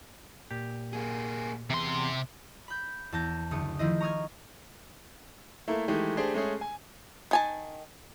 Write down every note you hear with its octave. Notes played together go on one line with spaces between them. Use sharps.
A#2 G4
A#3 G#4
E2 C3 C6
B5 G6
E2 A5 G6 A#6
F#1 D2 D#6 C#7
D#3 F3 A3 E4 C5 D#5
A#5 C#6 D#6 F6 G#6
A3 A#3 E4
D#3 E3 G#3 A3 G4
A3 D4 G4 G#4 C5 G5
G#3 A3 C#4 G#4
G#5
D#3 G#5 A5